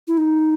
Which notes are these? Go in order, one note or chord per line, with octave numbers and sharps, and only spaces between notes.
E4
D#4